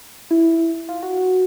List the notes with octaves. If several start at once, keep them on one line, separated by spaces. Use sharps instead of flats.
E4
F4
F#4